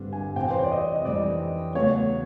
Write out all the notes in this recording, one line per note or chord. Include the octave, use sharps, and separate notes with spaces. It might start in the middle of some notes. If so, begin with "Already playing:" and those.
Already playing: G2 D3 G3 C4
G#5
F2 C3 E3 G3 C4 G5
C5
C#5
D5
D#5
D#5
F2 C3 E3 G3 C4 D5
E2 C#3 F#3 A3 C#4 C#5